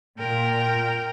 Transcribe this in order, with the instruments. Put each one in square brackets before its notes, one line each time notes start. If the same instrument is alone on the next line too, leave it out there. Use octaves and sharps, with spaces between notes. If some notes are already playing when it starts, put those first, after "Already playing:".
[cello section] A#2 [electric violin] A#4 G5